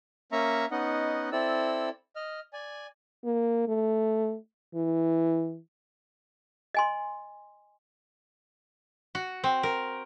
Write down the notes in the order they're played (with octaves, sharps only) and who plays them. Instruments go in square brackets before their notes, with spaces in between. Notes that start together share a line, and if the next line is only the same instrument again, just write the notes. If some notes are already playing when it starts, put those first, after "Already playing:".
[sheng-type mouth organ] A#3 C#4 E5 A#5 C#6
B3 C#4 D#4 D#5 F#5
C4 E4 A4 D5 E6
D#5 F6
D5 G#5
[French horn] A#3
A3
E3
[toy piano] D#5 G#5 C6
[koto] F#4
C4
A#4